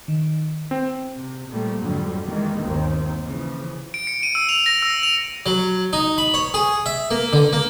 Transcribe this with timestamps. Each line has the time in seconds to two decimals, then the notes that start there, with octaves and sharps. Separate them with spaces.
0.08 D#3
0.71 C4
1.17 C3
1.49 A#2 F3 G3 A3 A#3
1.82 F2 G#2 D3 F#3 G3
2.27 D#3 E3 G3 G#3 A#3
2.62 G1 D#2 D#3 A#3 C4
3.23 C#3 E3 F3
3.94 D7
4.07 C#7
4.23 D#7
4.35 E6
4.49 F7
4.66 A#6
4.82 E6
5.03 F7
5.46 F#3
5.93 D#4
6.18 B5
6.34 C#5
6.54 G#4
6.86 E5
7.11 A#3
7.33 D3
7.53 A#3